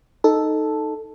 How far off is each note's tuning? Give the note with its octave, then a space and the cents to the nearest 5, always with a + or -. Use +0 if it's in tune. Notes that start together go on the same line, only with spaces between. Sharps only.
D#4 +0 A4 +0